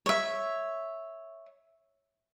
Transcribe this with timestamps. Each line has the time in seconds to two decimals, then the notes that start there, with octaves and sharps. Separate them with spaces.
0.06 C#5 E5